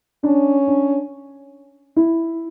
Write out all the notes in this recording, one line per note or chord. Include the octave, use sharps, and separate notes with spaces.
C#4 D4
D4
E4